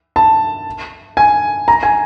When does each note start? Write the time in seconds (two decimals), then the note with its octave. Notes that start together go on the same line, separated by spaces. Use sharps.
0.16 A5
1.17 G#5
1.68 A#5
1.83 G#5